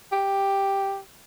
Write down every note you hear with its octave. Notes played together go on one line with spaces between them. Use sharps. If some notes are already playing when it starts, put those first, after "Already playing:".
G4